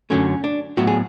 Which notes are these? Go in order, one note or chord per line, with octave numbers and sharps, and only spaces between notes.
F#2 D3 F#3 A3 C#4
D4
A2 F#3 B3 F#4
G#4